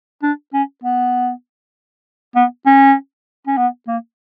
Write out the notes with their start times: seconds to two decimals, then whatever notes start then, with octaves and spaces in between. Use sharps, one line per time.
0.23 D4
0.54 C#4
0.84 B3
2.36 B3
2.66 C#4
3.47 C#4
3.57 B3
3.88 A#3